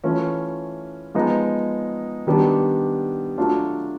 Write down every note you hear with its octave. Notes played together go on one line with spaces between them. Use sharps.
E3 A3 C#4 F4
F3 G#3 B3 D#4
D#3 G3 B3 D4
F#3 A3 D4 F4